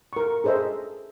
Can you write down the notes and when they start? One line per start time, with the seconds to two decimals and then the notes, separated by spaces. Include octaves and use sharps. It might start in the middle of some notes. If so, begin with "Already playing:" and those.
0.13 A#4 C#6
0.44 G#4 A4 C5 D#5 E5